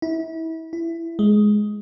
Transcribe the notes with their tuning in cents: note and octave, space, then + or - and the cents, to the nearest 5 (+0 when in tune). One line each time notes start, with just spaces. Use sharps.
E4 -30
E4 +15
G#3 +10